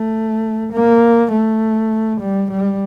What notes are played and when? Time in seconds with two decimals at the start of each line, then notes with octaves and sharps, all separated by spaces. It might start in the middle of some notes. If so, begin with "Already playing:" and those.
Already playing: A3
0.73 A#3
1.32 A3
2.21 G3
2.51 G3